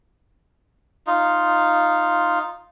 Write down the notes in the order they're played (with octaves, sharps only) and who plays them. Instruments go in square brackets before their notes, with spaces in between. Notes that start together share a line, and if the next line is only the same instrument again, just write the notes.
[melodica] D#4 F4